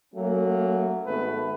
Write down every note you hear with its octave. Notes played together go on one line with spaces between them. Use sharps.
F#3 A3 A#3 C#4
G#1 A3 B3 B4